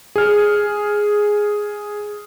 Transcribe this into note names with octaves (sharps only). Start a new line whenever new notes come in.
G#4 F6